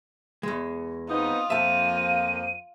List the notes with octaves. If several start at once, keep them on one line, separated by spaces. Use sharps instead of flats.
E2 G#3
B3 C4 D#4 F4 D#6
F2 F3 A#3 E5 A5 D#7